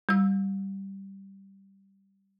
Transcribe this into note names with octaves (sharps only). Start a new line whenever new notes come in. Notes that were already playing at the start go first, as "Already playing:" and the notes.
G3 E6